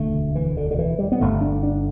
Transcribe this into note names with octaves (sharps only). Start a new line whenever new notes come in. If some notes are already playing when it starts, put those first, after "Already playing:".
Already playing: E1 D2 D3 A3
E3
D3
D3
E3
G3
B3
G1 G2 D3 A3
D4
D4